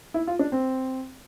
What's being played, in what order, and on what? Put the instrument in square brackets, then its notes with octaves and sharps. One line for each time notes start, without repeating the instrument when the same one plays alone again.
[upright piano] E4
F4
D4
C4